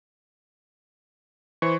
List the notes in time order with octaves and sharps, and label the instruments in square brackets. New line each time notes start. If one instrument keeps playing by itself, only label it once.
[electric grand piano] E3 [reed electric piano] C5 C#6